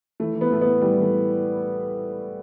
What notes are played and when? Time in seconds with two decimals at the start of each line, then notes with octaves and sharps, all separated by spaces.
0.20 E3 A3
0.35 E3
0.41 B3
0.51 A2 A3
0.61 A2 B3
0.81 E3 G3
0.97 E3 A3